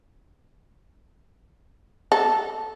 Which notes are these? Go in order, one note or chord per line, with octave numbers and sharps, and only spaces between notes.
A4